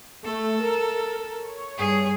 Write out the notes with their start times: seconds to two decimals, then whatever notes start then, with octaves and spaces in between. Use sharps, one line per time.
0.24 A3 A4
0.62 A#4
1.44 C#5
1.78 G2 G#4